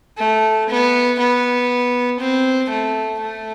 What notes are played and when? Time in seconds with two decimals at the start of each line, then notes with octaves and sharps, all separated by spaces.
0.18 A3
0.69 B3
1.19 B3
2.20 C4
2.69 A3
3.20 A3